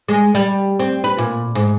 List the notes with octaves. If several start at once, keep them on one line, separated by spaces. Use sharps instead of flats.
G#3
G3
C4
B4
A#2
G#2